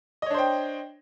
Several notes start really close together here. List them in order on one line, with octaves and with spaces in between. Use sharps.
D#5 C#5 D4 C5 G5